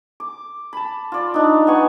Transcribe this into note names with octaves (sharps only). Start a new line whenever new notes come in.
D6
A5 B5
F4 D5
D4 D#4
B3 G#5 C#6